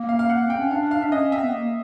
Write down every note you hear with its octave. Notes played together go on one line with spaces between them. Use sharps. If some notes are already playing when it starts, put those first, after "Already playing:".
Already playing: A#3
F5
F5
F#5
C4 G5
C#4
D4 F5
F5
D4 E5
C#4 D#5
C4 E5
B3
A#3